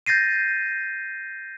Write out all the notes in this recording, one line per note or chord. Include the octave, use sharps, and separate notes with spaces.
G6 A6 A#6 C7 D#7